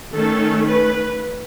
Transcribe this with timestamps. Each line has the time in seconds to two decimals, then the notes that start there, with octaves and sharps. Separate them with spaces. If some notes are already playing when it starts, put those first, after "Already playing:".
0.13 D#3 A3 C#4 A4
0.65 B4